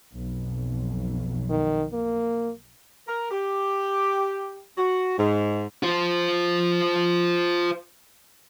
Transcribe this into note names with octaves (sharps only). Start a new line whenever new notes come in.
B1 F2
D#3
A#3
A#4
G4
F#4
G#2
F4 C5